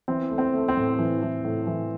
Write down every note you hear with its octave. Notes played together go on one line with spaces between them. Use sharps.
E3 C4
A3
C4
A3
C4
A2
E3
E3
A2
E3